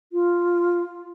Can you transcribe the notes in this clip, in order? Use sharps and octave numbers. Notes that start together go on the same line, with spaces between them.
F4